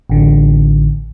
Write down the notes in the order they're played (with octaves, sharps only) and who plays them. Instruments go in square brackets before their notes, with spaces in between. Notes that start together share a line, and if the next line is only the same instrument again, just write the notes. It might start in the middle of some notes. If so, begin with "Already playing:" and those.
[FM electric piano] A1 D3